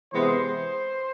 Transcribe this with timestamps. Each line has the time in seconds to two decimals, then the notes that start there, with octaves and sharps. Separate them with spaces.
0.13 C3 E3 G#3 B3 C5